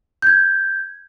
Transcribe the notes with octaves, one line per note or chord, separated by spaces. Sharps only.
G6 G#6